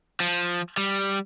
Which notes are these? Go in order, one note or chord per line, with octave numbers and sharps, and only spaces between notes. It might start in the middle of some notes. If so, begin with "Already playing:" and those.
F3
G3